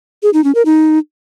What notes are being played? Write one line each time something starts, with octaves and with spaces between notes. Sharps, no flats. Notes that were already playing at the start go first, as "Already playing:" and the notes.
G#4
D#4
C#4
A#4
D#4